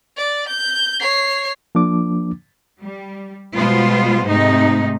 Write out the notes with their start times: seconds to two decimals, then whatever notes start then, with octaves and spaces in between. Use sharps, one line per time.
0.17 D5
0.48 G6
1.00 C#5 C7
1.75 F3 A#3 D4 D6
2.82 G3
3.55 B2 G3 G#3 B3 F4 C5
4.27 G#2 C3 A3 D#4